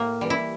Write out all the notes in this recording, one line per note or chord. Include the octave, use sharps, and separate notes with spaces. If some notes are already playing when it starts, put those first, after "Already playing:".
Already playing: A2 A#3
E3 G3
E4